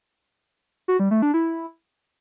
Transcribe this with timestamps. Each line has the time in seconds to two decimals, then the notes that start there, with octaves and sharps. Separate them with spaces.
0.88 F#4
1.00 G3
1.11 A3
1.22 D4
1.34 E4